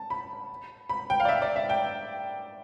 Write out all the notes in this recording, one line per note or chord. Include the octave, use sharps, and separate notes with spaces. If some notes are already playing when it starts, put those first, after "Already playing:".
Already playing: A5
B5
B5
G5
F5
D5
E5
D5
E5
G5